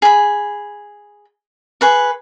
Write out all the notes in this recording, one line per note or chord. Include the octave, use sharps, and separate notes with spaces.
G#4 B5
G#4 B4 C#6